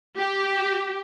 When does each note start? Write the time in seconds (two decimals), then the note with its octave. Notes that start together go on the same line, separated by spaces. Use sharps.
0.19 G4